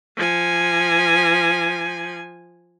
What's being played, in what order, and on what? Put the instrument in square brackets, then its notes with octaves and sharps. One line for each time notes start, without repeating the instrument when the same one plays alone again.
[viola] F3 G#5